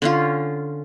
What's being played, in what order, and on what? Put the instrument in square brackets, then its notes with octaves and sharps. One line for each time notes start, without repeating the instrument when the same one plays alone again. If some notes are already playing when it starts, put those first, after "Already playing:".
[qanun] D3 C#4 F4